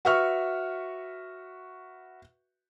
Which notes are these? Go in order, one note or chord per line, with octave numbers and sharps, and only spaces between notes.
F#4 B4 E5 C#6 F6